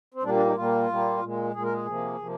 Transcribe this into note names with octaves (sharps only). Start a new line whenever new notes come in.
C4
A#2 G3 A#3 D4
D4
D#4
A#2 G3 A#3 F4
A#2 G3 A#3
A#2 G#3
A#2 G#3 G#4
A#4
G#4
C3 F3 A#3
C3 F3 A#3